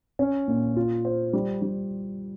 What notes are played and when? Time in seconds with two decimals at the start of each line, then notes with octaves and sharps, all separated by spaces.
0.19 C#4
0.48 A#2
0.77 F4
1.05 C5
1.33 G3
1.62 G3